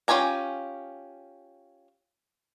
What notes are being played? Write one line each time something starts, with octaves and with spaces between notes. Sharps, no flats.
C#4 F4 G4 G#5 A#5